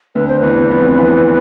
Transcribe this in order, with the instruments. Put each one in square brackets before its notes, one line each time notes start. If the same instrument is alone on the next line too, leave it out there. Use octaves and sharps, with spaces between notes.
[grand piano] D2 D3 [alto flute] B4
[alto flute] C5
[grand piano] E2 E3 [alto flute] B4
[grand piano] F2 F3
E2 E3